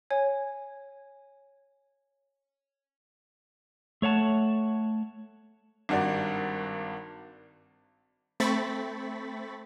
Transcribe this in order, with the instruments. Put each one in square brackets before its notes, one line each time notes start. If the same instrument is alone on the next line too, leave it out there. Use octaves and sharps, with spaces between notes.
[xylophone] C#5 G#5
[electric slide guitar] A3 C#5 F#5 A5
[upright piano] G#1 G2 F#4 A#4 D5
[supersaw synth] A3 C4 B5 C#6 A6 B6